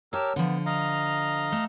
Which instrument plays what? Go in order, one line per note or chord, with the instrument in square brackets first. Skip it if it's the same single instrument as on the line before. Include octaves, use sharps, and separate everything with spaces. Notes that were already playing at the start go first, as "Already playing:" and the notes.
[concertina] G4 A#4 E6 [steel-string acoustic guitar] C#5 A5
[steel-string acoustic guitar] D3 F3 [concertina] B3
[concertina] D#5 F5 A#5
[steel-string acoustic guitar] A3